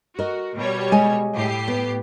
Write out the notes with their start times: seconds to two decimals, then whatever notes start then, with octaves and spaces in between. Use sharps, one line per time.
0.19 F#4 A#4 D#5
0.56 B2 G3 C#5
0.92 G#3 G#5
1.34 A2 G4 C7
1.68 B3